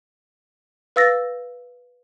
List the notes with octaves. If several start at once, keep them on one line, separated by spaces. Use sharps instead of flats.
B4 F5 E6 A6 A#6